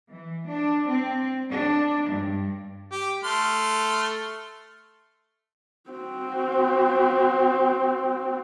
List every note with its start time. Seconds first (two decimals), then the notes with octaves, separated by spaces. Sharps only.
0.12 E3
0.49 D4
0.89 C4
1.51 D4
2.09 G2
2.91 G4
3.24 A3 C6 F6
5.90 C4 F#4